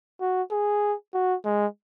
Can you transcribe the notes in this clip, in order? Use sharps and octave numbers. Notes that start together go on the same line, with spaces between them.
F#4
G#4
F#4
G#3